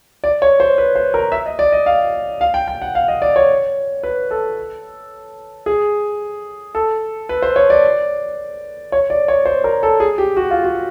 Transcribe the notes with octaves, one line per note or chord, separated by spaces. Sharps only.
D5
C#5
C5
B4
C5
A#4
E5
D#5
D5
D#5
F5
F5
G5
G5
F#5
F5
D#5
D5
C#5
B4
A4
G#4
A4
B4
C5
C#5
D5
C#5
D5
C#5
C5
A#4
A4
G#4
G4
F#4
F4
F#4